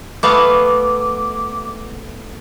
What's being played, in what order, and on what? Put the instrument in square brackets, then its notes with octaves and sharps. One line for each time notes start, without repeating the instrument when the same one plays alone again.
[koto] A3 B3 F5 [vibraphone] D6